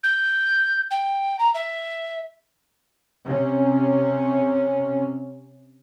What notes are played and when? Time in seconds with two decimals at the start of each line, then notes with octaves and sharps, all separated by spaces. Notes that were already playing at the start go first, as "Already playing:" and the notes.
0.04 G6
0.91 G5
1.39 A#5
1.55 E5
3.24 C3 C#4